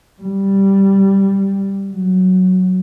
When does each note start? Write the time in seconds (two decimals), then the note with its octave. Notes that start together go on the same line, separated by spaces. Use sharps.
0.21 G3
1.90 F#3